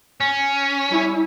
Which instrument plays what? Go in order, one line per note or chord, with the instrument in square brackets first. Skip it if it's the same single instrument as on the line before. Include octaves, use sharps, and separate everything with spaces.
[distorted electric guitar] C#4
[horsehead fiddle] G3 E4